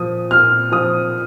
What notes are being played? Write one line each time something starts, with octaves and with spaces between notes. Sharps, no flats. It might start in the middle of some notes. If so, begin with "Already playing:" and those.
Already playing: A#2 F3 D#6
A#2 F6
F3 D#6